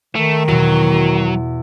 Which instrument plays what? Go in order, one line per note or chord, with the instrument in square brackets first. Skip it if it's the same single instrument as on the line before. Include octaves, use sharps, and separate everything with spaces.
[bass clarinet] D#3 [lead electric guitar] A3
[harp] E2 B2 [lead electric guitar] F#3